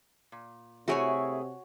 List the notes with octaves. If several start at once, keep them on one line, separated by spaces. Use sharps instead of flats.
A#2
C3 A3 E4 F#4 G#4 C#5 G#5